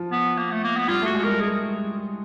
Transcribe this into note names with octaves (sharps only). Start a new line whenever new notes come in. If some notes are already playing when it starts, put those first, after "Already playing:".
Already playing: F3
B3
A#3
A3
A#3
B3
G3 F4
A3
F#4
G#3
G3 A#4
G3 G#4